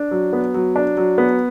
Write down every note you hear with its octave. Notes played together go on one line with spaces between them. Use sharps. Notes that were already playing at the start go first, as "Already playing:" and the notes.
Already playing: D4
F#3
B3
F#3
D4
F#3
B3